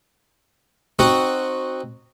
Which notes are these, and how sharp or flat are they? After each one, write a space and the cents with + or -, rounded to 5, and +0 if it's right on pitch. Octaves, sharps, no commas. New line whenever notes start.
C4 +5 D#4 -15 F#4 +0